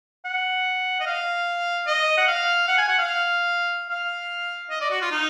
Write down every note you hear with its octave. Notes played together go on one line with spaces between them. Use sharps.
F#5
D#5
F5
D#5
F#5
F5
F#5
G#5
F#5
F5
F5
D#5
D5
F#4
F4
D#4